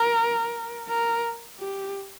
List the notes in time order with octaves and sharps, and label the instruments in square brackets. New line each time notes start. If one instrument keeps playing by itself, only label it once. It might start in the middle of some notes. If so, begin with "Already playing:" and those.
Already playing: [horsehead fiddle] A#4
A#4
G4